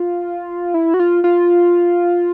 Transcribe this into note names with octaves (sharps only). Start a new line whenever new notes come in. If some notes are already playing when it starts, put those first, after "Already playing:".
Already playing: F4
E4
F#4
F4
F4